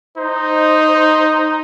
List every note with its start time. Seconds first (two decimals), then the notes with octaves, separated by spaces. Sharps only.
0.17 D#4 C5